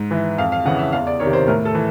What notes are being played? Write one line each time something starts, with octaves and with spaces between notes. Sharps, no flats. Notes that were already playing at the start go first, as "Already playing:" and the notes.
Already playing: G#2
E3
F2 F5
F5
C#3 E3 F#5
E5
E2 F5
D5
C3 D#3 C#5
C5
A2 A#4
A4
E3